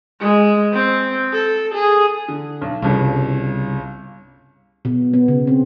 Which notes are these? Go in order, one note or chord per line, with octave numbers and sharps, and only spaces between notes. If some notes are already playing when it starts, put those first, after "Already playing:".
G#3
C4
A4
G#4
D3
B1
G1 C2 C#3
B2
B3
C#3
C4